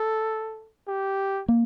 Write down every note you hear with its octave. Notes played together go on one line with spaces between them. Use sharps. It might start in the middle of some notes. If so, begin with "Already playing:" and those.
Already playing: A4
G4
A#3